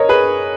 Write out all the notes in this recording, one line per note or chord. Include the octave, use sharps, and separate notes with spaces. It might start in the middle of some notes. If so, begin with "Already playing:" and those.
Already playing: A#4 C#5 D#5
G#4 B4